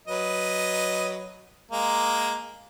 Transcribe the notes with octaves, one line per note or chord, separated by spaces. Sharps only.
F#3 B4 D#5
G#3 A#3